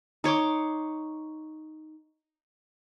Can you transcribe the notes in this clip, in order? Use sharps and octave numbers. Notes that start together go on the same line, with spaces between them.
D#4 C#5 C6 D6